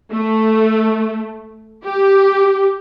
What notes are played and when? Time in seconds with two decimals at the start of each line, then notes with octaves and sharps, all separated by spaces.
0.11 A3
1.85 G4